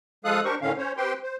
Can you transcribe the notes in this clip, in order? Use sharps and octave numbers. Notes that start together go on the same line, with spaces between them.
F3 G#3 A4 F5 D#6 F#6
D4 G4 A#4 C5 C#6
A2 D3 D#3 C#4 F5
C#4 C5 C#5
C4 G4 B4 C5 G5 C6
C5